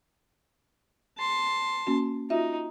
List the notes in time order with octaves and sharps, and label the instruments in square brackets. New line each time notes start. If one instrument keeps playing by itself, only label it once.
[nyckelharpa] A5 C6
[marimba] A#3 C#4 F#4
[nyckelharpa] D#4 [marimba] F4 F#4 E5